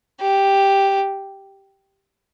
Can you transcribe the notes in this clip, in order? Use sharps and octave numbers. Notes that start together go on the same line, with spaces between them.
G4